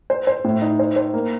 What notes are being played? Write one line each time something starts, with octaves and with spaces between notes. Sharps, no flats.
C5
C5
A2
D#4
C5
C5
A#3